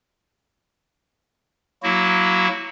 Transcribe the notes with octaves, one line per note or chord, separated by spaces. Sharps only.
F#3 A#3 E4 F#4